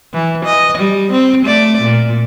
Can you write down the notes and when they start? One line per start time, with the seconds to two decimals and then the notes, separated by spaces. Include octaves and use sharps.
0.13 E3
0.45 D#5
0.78 G3
1.12 C4
1.45 A3 D5
1.82 A#2